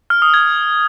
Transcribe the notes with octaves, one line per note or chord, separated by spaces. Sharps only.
F6
D#6
G#6